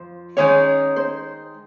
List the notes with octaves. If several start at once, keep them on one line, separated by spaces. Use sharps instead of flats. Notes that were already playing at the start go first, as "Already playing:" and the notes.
Already playing: F2 F3 C5
D#3 G#3 C#4 D#4 C#5
C5